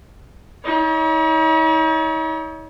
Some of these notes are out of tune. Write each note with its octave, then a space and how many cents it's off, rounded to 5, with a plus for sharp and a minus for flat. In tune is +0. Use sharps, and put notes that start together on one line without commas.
D#4 +45 C#5 +35